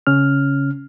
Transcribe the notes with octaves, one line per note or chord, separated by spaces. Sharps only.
C#3 C#4 F6